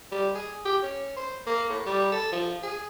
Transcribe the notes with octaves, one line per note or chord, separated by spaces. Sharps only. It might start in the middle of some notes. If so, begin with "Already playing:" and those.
G3
G#4
G4
C#4
C5
A#3
A2
G3
A4
F3
G#4